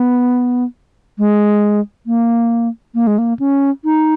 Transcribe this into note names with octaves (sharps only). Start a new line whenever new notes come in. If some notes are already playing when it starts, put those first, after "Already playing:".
Already playing: B3
G#3
A#3
A#3
G#3
A#3
C#4
D#4